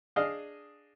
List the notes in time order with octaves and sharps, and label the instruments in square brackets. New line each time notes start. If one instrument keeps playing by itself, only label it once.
[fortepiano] D4 G#4 D#5 F5